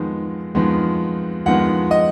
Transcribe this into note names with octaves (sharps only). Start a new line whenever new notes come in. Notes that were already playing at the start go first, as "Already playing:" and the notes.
Already playing: F2 D#3 G#3 B3
F2 D#3 G#3 B3
F2 D#3 G#3 B3 F#5
D#5